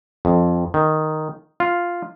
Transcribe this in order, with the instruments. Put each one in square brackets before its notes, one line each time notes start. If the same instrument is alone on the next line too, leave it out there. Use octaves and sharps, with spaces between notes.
[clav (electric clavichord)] F2
D#3
F4